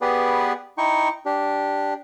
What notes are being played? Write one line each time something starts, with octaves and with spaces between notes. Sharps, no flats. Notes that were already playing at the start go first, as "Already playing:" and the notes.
B3 G4 G#4 B4 D5
D#4 E4 G5 C#6
D4 G4